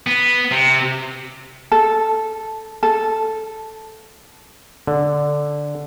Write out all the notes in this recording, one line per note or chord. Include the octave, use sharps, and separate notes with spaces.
B3
C3
A4
A4
D3